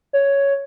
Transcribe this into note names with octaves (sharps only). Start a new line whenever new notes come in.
C#5